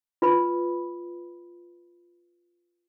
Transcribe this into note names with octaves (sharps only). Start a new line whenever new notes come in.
F4 B4 B5